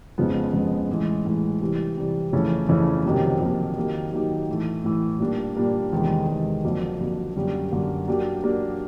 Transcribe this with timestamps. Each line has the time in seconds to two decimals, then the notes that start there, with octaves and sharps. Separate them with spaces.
0.18 F2 C#3 F3 G#3 B3
0.53 F2 C#3 F3 G#3 B3
0.89 A2 E3 G#3
1.25 A2 E3 G#3
1.61 C3 E3 G3
1.97 C3 E3 G3
2.32 F2 C#3 E3 A3 C#4
2.69 F2 C#3 E3 A3 C#4
3.05 F2 C3 D#3 F#3 A#3
3.40 F2 C3 D#3 F#3 A#3
3.76 D#3 F#3 A#3 D#4 G4
4.13 D#3 F#3 A#3 D#4 G4
4.49 A2 E3 A3
4.84 A2 E3 A3
5.20 A#2 G3 A#3 D4
5.57 A#2 G3 A#3 D4
5.93 E2 C3 D#3 G#3
6.28 E2 C3 D#3 G#3
6.63 F2 D3 F#3 A#3 D4
7.00 F2 D3 F#3 A#3 D4
7.36 F#2 D3 G3 A#3
7.72 F#2 D3 G3 A#3
8.08 F#3 A#3 D4 G4
8.43 F#3 A#3 D4 G4